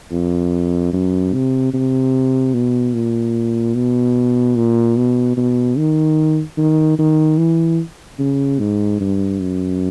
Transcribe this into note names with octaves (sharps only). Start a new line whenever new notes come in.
F2
F#2
C3
C3
B2
A#2
B2
A#2
B2
B2
D#3
D#3
D#3
E3
C#3
G#2
G2
F#2